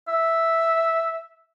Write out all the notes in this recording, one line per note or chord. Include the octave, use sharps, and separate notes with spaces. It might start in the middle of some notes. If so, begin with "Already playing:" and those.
E5